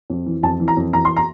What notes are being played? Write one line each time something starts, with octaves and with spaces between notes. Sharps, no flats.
F2
E3
F2 A5
E3
A#5
F2
E3 A#5
C6
A#5